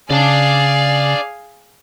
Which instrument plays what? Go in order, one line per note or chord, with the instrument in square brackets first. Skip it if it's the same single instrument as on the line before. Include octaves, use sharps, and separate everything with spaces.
[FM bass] C#3 [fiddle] G#4 F5 [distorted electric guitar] D5 A5